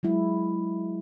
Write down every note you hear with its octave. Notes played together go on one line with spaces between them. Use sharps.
F#3 G#3 E4